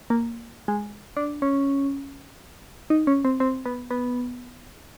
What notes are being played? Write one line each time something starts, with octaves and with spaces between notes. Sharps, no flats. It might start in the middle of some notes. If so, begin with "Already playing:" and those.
A#3
G#3
D4
C#4
D#4
C#4
C4
C4
B3
B3